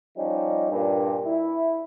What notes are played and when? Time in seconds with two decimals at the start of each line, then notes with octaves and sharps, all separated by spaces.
0.18 F3 G3 C#4 D#4
0.71 G2 A#2
1.26 E4